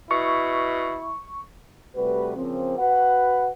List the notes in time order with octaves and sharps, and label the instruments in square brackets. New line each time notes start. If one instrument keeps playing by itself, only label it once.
[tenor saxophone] B2 [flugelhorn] E4 [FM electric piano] C#6
[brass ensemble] C3 G3 A3 F#4 B4
C#3 F3 A#3 C4
F#4 B4 F#5